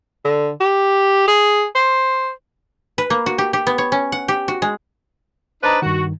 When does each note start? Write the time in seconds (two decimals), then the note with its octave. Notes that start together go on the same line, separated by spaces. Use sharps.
0.25 D3
0.61 G4
1.28 G#4
1.75 C5
2.98 B4
3.10 A#3
3.26 F#4
3.38 G4
3.53 G4
3.67 B3
3.78 C#5
3.92 C#4
4.12 F#5
4.28 G4
4.48 F#4
4.62 G#3
5.64 D4 D#4 B4 C5 A#5
5.82 G2 D#3 F#4